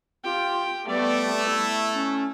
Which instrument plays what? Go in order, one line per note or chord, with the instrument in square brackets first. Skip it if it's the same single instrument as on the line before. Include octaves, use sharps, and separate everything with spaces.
[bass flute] F4 [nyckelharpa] G4 G5
[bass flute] G3 [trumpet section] A3 [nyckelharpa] B3 D5
[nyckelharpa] E4
[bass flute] C#4